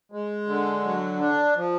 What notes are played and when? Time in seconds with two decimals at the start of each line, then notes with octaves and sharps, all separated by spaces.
0.12 G#3
0.47 D3
0.84 F#3
1.20 D4
1.56 F3